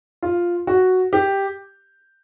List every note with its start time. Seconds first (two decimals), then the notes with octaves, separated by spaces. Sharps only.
0.22 F4
0.67 F#4
1.13 G4